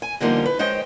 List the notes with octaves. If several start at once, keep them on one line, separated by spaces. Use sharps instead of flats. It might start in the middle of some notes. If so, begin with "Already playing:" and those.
G#5
E2 D3 F3 G3 A#3 D#4
B4
G#3 C5 C#5 D#5 G5